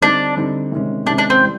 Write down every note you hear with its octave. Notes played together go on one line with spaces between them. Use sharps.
D3 G3 C4 D4 D#4
D3 G3 C4 D#4
C3 D#3 G#3 C#4
C3 D#3 G#3 C#4 D4
D4
C4
E3 G3